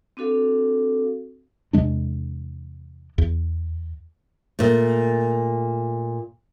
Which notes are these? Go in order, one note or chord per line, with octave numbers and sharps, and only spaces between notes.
C4 D4 F#4 A4 F5
E2 C3 G#3 D4
E2
A#2 A3